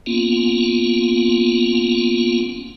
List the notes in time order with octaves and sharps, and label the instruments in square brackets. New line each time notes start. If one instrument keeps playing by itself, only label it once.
[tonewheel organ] A#3 B3 C#4 F4